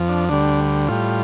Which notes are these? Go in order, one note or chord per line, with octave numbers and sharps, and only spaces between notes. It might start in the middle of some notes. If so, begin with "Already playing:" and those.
Already playing: F2 F3
D4
D2 D3 G3 D4
A2 G3 F4